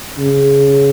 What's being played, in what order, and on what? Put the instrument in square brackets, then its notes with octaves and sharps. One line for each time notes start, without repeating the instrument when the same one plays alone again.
[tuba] C#3